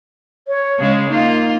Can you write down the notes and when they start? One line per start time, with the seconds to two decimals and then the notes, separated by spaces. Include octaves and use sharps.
0.48 C#5
0.78 C#3 G#3
1.09 A#3 D#4 F4